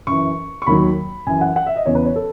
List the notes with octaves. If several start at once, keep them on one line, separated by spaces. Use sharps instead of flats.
F#2 E3 C#6
C#6
D#2 D#3 F#3 B5
F#2 E3 G#5
F#5
F#5
E5
D#5
E2 C#3 E3 C#5
B4
C#5
A4